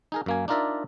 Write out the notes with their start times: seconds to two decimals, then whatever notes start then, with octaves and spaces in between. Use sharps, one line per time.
0.12 D#4 G#4 A#4
0.26 F#2 A#3 G#5
0.48 D4 D#4 F4 A#4 D5 E5